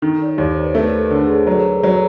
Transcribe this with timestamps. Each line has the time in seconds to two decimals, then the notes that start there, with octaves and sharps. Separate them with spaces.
0.02 D#3 A4
0.22 D5
0.26 C#5
0.38 D#2
0.50 C5
0.64 B4
0.74 A3 A#4
0.99 A4
1.10 D3
1.23 G#4
1.47 F#3
1.84 F#3